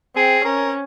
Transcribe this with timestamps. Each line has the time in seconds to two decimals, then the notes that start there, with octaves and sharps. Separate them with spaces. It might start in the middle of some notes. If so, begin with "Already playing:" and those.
0.16 C4 G#4
0.45 C#4 A#4